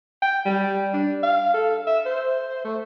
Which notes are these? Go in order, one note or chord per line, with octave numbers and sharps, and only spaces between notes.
G5
G3
D4
F5
A4
E5
C5
A3